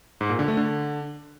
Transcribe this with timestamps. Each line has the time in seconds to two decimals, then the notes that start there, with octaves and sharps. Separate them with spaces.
0.21 G#2
0.30 A#2
0.39 D3
0.48 A3
0.57 D3